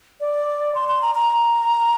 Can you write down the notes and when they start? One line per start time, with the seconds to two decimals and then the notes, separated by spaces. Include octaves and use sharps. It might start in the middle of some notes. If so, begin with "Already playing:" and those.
0.21 D5
0.75 C6
0.89 C6
1.02 A#5
1.15 A#5